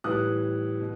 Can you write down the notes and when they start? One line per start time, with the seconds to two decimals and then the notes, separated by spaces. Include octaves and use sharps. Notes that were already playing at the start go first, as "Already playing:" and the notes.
0.04 A2 E3 G3 D#6 F#6
0.80 B2